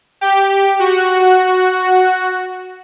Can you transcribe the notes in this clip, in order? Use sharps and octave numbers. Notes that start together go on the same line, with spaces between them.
G4
F#4